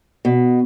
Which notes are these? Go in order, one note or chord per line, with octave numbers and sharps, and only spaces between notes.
B2